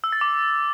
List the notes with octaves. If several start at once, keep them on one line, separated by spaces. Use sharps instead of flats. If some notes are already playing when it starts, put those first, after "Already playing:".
E6
A6
D6